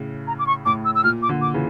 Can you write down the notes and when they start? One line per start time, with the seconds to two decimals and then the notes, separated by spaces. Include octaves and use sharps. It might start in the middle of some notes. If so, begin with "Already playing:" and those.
Already playing: A2 C#3
0.27 A#5
0.39 D6
0.47 C#6
0.65 A2 D6
0.85 E6
0.95 E6
1.04 A#2 F6
1.22 D6
1.29 A#2 D3
1.41 D6
1.54 C#3 E3